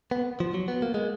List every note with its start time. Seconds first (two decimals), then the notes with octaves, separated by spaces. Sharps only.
0.11 B3
0.40 F3
0.54 F#3
0.68 B3
0.82 A#3
0.94 G#3